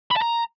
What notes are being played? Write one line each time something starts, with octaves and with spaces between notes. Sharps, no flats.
B5
A5
A#5